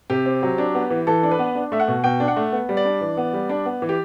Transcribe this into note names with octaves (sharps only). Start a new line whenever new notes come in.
C3 G4
C4
F#3
D4
B3
E3
E3 A4
D4
B4
B3
D4
A3 E5
F#5
B2
B2 G5
D4
F#5
A3
B3
G3
D5
D4
E3
B3
G3
D4
B3
E3
G4